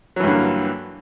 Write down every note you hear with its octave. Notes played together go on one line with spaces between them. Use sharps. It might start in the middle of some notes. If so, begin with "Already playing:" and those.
G2 D3 E3 F#3 A#3